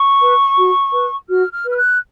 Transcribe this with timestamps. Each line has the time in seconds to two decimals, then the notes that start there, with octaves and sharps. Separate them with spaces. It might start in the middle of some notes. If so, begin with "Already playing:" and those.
Already playing: C#6
0.20 B4
0.57 F#4
0.93 B4
1.28 F#4 F6
1.51 F6
1.64 B4
1.70 F6
1.76 F#6